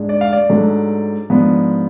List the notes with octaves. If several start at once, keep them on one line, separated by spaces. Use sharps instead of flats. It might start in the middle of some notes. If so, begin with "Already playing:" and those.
Already playing: G#2 G#3 D4
D5
F5
D5
G#2 F#3 A3 D4
G#2 F3 B3 D4